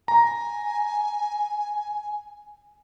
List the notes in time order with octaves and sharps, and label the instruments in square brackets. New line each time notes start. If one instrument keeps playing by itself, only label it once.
[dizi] G#5 [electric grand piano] A#5